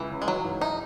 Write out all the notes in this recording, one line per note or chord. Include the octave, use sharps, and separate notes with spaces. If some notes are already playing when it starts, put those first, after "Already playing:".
Already playing: C#2 E3
C#3
G#3
E3 F#3
G#2
D#4 E4